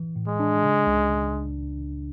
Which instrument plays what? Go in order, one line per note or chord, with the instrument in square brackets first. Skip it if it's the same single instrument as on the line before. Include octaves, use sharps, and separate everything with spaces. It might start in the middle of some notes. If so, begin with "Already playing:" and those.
Already playing: [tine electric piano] E3
A2
[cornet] G#3
[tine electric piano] D4
C#3
C#2